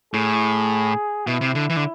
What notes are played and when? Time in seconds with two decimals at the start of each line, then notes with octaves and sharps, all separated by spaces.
0.14 A2 G#4
1.27 B2 E4
1.41 C3
1.55 D3
1.70 E3
1.77 D3